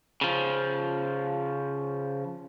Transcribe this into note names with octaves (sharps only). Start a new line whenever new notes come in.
C#3 F3